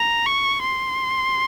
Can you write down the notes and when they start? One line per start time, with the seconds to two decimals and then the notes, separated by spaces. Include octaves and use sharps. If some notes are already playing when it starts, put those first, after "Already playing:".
Already playing: A#5
0.26 C#6
0.62 C6